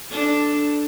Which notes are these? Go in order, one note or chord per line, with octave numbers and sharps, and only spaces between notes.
D4 A4